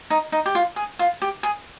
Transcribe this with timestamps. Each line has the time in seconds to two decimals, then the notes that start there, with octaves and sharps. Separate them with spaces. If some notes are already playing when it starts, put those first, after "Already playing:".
0.10 D#4
0.32 D#4
0.46 G4
0.55 F4
0.76 G#4
0.99 F4
1.22 G4
1.43 G#4